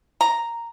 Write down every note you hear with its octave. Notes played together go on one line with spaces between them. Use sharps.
A#5